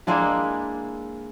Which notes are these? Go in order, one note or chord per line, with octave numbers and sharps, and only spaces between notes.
G#3 A#3 D4 E4